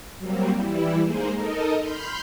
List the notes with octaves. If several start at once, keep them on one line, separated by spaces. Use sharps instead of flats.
F#3 G3 A#3 C4
E3 G3 E4
G#3 A#3 D#4 G#4 C5
D#4 A4 A#4 D#5
B5 C6 F6 G6